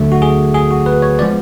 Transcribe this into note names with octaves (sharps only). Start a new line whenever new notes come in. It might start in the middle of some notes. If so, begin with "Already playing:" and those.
Already playing: D2 D3 F#3 A3
F#4
G#4
G#4
F#4
B4
C#5
F3 G#3 B3 D5